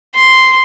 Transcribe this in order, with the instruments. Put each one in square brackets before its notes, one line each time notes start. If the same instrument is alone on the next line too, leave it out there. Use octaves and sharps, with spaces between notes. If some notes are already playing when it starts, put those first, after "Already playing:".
[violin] C6